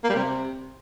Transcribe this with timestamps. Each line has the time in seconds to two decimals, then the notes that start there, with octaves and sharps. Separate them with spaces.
0.04 A#3
0.10 G3
0.16 C3